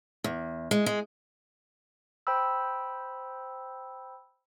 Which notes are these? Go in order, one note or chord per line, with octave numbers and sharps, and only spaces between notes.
E2
G#3
G#3
C5 G5 B5 E6